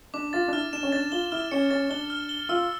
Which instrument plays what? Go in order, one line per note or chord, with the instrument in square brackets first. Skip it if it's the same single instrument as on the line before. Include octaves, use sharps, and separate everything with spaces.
[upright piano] D4 [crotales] D6
[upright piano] F4 [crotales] A6
[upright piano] D4
[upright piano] E4 [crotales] F6
[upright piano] D4 [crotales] E7
[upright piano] C#4
[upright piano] D4 [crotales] A6
[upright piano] F4 [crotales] G7
[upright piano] E4 [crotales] F6
[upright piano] C#4 [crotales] C#7
[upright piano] C#4 [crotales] A6
[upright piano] D4 [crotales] G7
[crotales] F6
G7
[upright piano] F4 [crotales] E6